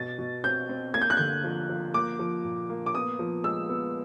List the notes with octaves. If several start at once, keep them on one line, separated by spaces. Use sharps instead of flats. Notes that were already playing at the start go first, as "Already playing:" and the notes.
Already playing: B2 A6
B2
C4 G6
C4
A#3 G#6
G6
F#6
D3 G6
F3
F3
A#3 D6
F3
A#2
A#3
D6
B3 D#6
F3
G#3 E6
B3